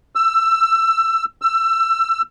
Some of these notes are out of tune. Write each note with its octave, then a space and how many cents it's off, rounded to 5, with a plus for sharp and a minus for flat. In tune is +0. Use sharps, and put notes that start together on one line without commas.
E6 +20
E6 +25